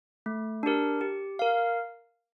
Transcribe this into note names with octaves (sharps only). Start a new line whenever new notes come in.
A3
D4 G4 A#4
G4
A#4 F5